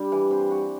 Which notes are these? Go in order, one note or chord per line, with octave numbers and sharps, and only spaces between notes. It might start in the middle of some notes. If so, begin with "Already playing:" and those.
Already playing: G2 G3 D4
E3
C4
F#4